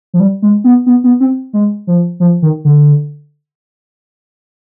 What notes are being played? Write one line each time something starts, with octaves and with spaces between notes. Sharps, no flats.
F3
G3
G#3
B3
B3
B3
C4
G#3
F3
F3
D#3
D3